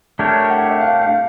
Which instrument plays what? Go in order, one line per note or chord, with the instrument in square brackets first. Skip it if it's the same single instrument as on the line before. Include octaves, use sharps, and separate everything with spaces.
[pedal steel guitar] A3 D4 G4 A#4 C#5 [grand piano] A5
[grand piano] F#5
E5
F5
F5